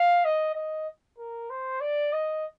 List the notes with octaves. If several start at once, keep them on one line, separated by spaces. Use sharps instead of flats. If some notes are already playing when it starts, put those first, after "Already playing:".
Already playing: F5
D#5
D#5
A#4
C5
D5
D#5